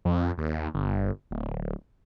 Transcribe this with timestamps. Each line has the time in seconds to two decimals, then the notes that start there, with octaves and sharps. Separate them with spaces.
0.05 F2
0.38 D#2
0.74 G1
1.31 D1